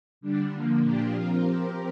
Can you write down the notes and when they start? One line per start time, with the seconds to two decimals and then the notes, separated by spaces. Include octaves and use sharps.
0.21 D3 G3 D4
0.51 D3 F3 A#3
0.81 A#2 F3 A#3 D4 G4
1.11 F3 C4 F4 A#4
1.41 F3 C4 G4 A#4